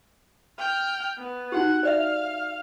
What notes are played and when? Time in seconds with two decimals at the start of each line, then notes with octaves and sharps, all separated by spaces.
0.59 G5 F6
1.18 B3
1.52 D#4 F#4 G4 F#5
1.83 C5 D5 E5 F5 F6